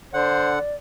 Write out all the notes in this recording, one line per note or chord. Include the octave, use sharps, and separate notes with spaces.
D3 C5 D5 F#5